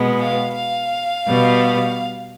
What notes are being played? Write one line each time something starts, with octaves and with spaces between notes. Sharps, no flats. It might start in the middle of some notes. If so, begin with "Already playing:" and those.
Already playing: B2 G#3 B3
F5
F5
B2 G3 B3